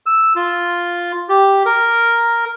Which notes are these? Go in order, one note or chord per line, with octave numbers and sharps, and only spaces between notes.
E6
F4
G4
A#4